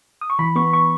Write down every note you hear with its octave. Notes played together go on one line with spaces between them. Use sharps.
D#6
C#6
E3 B5
B3 C#6
C#6